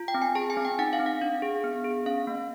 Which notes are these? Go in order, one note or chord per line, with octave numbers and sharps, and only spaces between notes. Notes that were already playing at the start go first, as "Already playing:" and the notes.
Already playing: F4
G5
C4
G#5
G#4 A5
G#5
C4
G5
D#4 F#5
F5
C4
F#5
D4 F5
G#4
B3
G#4
C#4 F5
A#3